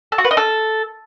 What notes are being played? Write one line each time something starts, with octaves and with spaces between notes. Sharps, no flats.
A4
F#4
B4
D#5
A4